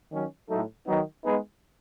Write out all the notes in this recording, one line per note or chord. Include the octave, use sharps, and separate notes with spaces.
D#3 F#3 C#4
A2 F#3 A3 D#4 A4
D#3 F#3 B3 D#4
G#3 B3 D#4 G#4 B4